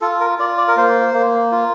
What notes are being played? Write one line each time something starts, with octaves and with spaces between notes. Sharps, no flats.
F4 A4
A#4
F4 D5
D5
A#4
A#3 C5
A#3
F4